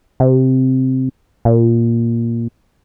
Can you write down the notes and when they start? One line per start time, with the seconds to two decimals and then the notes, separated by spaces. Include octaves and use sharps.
0.20 C3
1.45 A#2